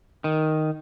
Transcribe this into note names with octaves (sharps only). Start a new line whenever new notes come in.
D#3